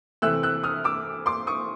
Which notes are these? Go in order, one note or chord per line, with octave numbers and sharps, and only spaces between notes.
C3 E3 A3 C4 E6 F#6
E6 F#6
D#6 F6
D6 E6
C6 D6
C#6 D#6